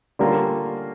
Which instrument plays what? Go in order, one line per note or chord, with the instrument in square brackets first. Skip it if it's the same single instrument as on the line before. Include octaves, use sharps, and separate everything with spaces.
[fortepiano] D3 G3 A#3 C#4 F4